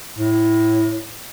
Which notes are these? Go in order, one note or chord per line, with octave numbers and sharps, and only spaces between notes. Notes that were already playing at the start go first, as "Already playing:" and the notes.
A2